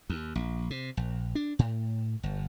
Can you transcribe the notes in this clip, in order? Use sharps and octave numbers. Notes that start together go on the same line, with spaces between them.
D#2
A#1
C3
A#1
D4
A2
G1